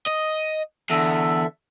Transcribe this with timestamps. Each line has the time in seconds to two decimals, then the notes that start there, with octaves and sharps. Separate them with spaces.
0.07 D#5
0.90 E2 D3 A4 E5